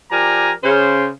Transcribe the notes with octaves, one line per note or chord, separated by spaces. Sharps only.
F3 G4 A#4 D5 G#5 A#5
C#3 C5